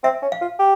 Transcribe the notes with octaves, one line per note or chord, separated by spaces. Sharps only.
C4 E5
C#4
F5
F4
G4